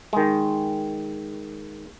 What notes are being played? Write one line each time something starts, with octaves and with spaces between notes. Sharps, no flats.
D#3 G#3